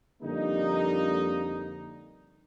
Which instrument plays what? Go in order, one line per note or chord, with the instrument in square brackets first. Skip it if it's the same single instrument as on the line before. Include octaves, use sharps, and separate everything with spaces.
[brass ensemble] F2 D3 G3 A#3 D#4